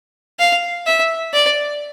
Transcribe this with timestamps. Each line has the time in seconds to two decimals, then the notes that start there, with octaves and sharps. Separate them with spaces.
0.39 F5
0.87 E5
1.33 D5